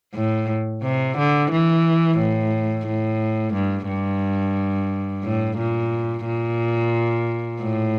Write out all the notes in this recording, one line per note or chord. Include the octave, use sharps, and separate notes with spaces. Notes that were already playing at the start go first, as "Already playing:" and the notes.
A2
C3
D3
E3
A2
A2
G2
G2
A2
A#2
A#2
A2